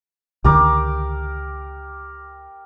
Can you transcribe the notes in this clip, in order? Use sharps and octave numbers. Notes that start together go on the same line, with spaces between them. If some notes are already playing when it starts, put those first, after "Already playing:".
C#2 D3 D#3 G4 A#4 D6